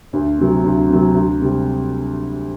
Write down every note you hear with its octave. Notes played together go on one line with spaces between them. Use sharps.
D2
C3 F#3
D2
C3 F#3
D2
C3 G3